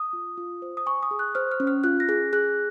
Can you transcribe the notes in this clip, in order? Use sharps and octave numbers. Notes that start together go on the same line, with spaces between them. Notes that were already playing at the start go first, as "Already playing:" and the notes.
Already playing: D#6
F4
F4
C5
D#6
G#5 C#6
D#6
G#4
F#6
C5 F6
F6
C#4
F6
F4 F#6
A#6
G#4
G#4 F#6